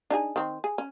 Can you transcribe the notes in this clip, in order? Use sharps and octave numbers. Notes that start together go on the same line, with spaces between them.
D4 D#4 G#4
D#3 C4
G#4
C#4